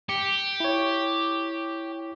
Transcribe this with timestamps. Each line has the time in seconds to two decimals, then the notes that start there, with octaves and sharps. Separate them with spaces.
0.09 G4 C#7
0.60 E4 C#5